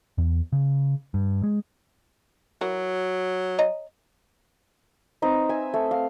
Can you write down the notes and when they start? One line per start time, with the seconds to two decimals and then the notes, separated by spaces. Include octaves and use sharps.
0.18 E2
0.52 C#3
1.14 G2
1.43 G#3
2.61 E3 F#3 F#4 A#4
3.58 C#5 D#5 A#5
5.22 C4 D#4 B4
5.49 E5 G#5
5.74 A3
5.91 F5